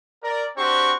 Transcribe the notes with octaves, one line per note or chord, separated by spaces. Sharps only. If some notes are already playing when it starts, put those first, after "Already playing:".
A#4 D5
C4 D4 F#4 G4 C5 C#6